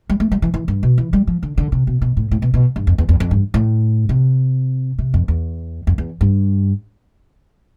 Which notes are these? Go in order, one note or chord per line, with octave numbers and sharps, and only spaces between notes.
G3
A3
G3
E3
E3
G2
B2
E3
G3
F3
D3
D3
C3
B2
B2
A2
A2
B2
B2
G2
F2
E2
E2
F2
G2
A2
C3
C3
F2
E2
F2
E2
G2